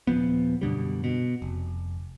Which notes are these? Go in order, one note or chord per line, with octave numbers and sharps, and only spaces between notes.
D#1 G#1 F3 B3
F#2 B2 D3 G3
B2
F1